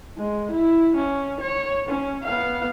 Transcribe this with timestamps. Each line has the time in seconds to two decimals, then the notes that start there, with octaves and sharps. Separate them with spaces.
0.17 G#3
0.51 E4
0.96 C#4
1.41 C#5
1.89 C#4
2.23 B3 F5